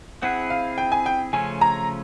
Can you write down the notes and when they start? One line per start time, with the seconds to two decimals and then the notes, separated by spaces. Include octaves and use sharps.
0.22 C4 E4 G#4 F#5
0.50 F5
0.78 G5
0.92 G#5
1.06 G5
1.33 C#3 F3 A3 C#4 G#5
1.61 A#5